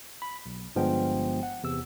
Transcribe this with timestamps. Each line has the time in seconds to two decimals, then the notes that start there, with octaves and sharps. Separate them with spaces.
0.22 B5
0.46 B1
0.75 G1 G2 F3 G#3 B3 G5
1.43 F#5
1.63 E2 C3 E6